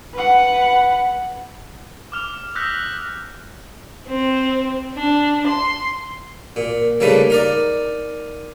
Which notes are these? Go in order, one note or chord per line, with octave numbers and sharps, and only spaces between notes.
B4 F#5
D6 F6 F7
D#6 E6 F#6 G6 A#6 B6
C4
D4
C6
A#2
C#3 G3 A3 A#3 D#4 B4
D#4 A#4 D5